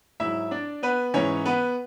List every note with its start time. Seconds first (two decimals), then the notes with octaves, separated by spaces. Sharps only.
0.20 G#2 F#3 E4 E5
0.51 D4 D5
0.83 B3 B4
1.14 G#2 E3 C#4 C#5
1.45 B3 B4